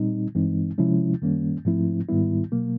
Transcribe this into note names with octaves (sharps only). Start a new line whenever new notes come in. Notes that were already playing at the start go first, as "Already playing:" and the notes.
Already playing: A#2 G3 C4 D#4
G2 E3 G#3 C4 D#4
C3 F3 G#3 C#4 E4
F#2 D#3 G3 A#3 C#4
G#2 F3 A3 C4 E4
G#2 D#3 G3 B3 E4
B2 F#3 A#3